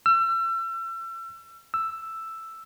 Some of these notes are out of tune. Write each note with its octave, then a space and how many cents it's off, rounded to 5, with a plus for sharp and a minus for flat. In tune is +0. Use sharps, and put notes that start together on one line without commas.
E6 +35
E6 +5